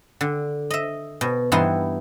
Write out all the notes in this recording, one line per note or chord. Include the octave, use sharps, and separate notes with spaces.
D3
D#5 E5
B2
G2 E3 B3 D#4 E4 C6